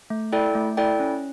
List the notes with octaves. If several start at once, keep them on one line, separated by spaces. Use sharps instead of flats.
A3
E4 A4 D5 G5
A3
E4 A4 D5 G5
C#4